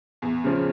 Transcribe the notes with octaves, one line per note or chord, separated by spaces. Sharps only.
E2
C#3 F3